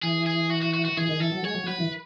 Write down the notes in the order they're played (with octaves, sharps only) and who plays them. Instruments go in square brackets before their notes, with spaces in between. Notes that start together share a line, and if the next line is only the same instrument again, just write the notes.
[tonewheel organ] E3 [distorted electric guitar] G#4
[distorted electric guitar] G#4
F#4
F#4
F#4
F#4
[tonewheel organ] E3 [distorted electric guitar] G#4
[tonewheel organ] D#3
[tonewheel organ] E3 [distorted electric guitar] A4
[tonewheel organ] F#3
[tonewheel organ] G#3 [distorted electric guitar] C#5
[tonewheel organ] F#3
[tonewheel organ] F#3 [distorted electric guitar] B4
[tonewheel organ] E3